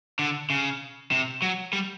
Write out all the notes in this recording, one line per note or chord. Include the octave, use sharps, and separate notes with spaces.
D3
C#3
C3
F#3
G3